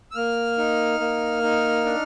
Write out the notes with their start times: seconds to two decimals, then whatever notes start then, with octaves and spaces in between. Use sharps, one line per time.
0.11 E6
0.15 A#3 F6
0.58 D#4
1.00 A#3
1.43 D#4
1.85 D4